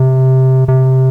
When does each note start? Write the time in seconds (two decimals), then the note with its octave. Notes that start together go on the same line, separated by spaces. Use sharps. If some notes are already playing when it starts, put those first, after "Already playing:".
Already playing: C3
0.68 C3